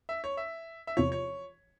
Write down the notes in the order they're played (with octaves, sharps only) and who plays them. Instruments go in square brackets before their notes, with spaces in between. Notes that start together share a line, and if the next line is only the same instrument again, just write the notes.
[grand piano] E5
C#5
E5
E5
[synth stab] E2 C3 F3 [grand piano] C#5
[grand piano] C#5